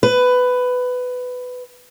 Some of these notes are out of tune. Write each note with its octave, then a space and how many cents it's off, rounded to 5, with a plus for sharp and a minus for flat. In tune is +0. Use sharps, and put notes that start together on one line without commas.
B4 +15